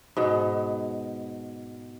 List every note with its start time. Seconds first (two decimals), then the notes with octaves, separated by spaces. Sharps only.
0.17 G#2 B2